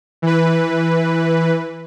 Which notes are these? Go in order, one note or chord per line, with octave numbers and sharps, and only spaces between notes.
E3 B4